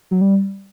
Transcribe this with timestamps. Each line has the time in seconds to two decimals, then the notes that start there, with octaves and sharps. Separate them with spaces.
0.11 F#3
0.21 G3